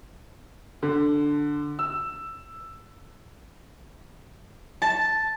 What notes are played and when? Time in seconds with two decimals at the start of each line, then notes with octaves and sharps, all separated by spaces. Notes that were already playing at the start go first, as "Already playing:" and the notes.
0.82 D3
1.79 E6
4.82 A5